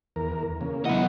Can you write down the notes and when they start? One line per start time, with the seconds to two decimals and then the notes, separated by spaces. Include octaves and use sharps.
0.16 E2 A#4
0.61 C#3 A#3
0.85 E3 F#3 B3 E4 D#5 F#5